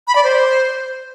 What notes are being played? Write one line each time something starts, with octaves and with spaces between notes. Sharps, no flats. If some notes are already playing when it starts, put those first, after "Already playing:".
B5
D5
C5